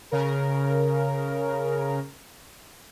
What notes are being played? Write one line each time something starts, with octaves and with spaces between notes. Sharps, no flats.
C#3 A#4